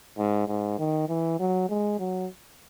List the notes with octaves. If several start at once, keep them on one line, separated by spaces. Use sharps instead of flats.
G#2
G#2
D#3
E3
F#3
G#3
F#3